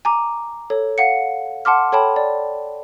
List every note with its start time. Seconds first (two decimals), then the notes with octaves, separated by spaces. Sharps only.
0.05 G#5 A#5 D6
0.70 A4 C#5
0.98 F5 F#5 C#7
1.65 F#5 A5 C6 D6 F6
1.92 A4 C#5 G5 A5 B5
2.16 D5